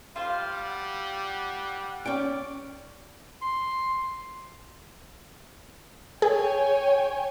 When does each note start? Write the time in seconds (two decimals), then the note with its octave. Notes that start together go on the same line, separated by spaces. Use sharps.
0.16 G3 F4 C5 F5
0.66 F#5
2.06 C#4 D5 G5
3.42 C6
6.22 G#4 C#5 G5 G#5